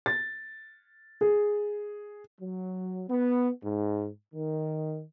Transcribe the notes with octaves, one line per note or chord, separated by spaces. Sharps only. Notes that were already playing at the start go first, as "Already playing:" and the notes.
A6
G#4
F#3
B3
G#2
D#3